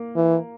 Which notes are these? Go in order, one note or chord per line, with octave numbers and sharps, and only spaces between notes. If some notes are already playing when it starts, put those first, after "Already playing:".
Already playing: A#3
E3